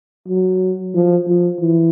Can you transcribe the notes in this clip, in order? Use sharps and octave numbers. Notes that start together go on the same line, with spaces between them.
F#3
F3
F3
E3